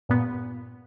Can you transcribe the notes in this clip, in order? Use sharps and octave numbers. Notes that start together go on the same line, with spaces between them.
G2 A#2 B3